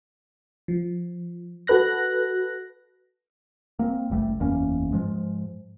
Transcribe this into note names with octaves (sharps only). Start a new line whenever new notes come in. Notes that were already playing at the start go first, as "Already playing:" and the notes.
F3
F#4 A4 B4 F#6 A#6
A#3 C4
F#1 C2 G3 A3
F#1 E2 A#3 C#4
G#2 F3 G#3